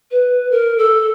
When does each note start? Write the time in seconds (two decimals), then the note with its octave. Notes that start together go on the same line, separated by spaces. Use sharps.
0.11 B4
0.50 A#4
0.78 A4